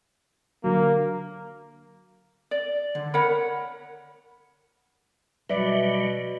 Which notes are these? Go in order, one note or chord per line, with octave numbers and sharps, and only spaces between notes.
D3 F#3 A#3
D5
D3
A#4 C#5 F#5 B5
B2 F#3 G3 B4 D5 E5